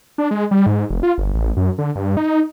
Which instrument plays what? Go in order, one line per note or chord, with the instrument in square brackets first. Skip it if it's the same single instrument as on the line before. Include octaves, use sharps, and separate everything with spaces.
[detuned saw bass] D4
G#3
G3
G#2
F1
F4
G1
A1
F#2
D3
G2
D#4